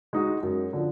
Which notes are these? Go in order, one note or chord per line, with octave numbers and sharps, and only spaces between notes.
G#3 D#4 F#4
F#2
D3 F3